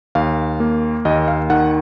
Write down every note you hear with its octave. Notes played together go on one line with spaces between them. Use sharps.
D#2 F5
A#3
D#2 D#5
F5
D#3 F#5